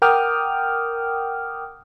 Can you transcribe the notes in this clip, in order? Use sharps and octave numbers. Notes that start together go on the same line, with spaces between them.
A#4 F#5 G5 D6 D#6 F6